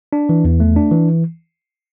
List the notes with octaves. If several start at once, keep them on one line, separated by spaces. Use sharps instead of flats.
D4
E3
E2
A3
D4
E3